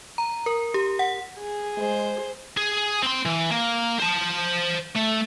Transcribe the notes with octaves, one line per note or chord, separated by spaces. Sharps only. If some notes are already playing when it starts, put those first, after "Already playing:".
A#5
A#4
G4
F#5
G#4
G#3 C5
G#4
C4 C6
E3
A#3
C5 A5
A3